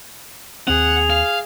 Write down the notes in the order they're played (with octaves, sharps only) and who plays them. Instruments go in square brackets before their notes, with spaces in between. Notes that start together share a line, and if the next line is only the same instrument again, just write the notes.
[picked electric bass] D#2 C4 [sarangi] G#4 [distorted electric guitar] F#5 [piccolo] F7
[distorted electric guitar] F5